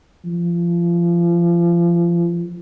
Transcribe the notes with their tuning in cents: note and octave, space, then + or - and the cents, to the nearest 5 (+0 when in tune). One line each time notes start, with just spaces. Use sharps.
F3 -30